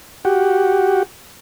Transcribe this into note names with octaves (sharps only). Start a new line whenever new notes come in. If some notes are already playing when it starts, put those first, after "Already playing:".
F#4 G4